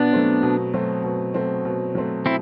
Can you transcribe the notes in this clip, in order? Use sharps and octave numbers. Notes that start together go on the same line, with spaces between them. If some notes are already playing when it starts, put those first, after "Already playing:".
Already playing: B2 B3 D4
F#3 A3 C4
B2
F#3 A3 C4
B2
F#3 A3 C4
B2
F#3 A3 C4
C4 E4